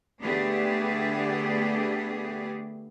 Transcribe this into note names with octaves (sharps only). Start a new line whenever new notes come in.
D3 A3 B3 D4 G4 G#4